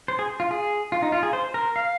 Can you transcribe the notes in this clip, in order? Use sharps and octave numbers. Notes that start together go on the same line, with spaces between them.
C5
G#4
F4
G#4
F4
D#4
F4
G#4
C5
A#4
F5